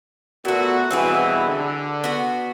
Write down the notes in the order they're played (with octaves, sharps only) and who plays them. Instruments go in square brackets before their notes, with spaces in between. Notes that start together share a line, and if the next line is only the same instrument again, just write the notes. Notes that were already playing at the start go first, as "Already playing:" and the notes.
[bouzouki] A#2 A3 [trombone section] B3 F#4
[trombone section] G2 B2 E3 [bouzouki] C4 F#4 G#4
[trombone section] D3
[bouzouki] B3 F#4